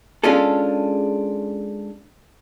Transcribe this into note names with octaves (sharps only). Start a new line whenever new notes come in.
G#3 C#4 D4 F4 G#4 A4